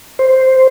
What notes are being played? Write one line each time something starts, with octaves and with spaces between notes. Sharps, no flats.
C5